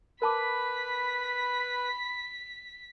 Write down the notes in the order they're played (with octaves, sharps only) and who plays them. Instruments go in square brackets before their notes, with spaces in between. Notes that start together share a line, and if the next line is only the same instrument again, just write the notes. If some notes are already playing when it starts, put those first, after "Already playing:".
[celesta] A#4 A5 D6 [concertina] B4 [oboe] B5 [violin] B6